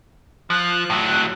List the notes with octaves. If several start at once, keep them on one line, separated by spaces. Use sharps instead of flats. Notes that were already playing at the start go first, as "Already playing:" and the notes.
F3 F#6
A2 F#3